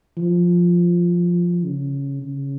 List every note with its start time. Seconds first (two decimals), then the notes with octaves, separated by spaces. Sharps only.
0.17 F3
1.64 C#3
2.22 C#3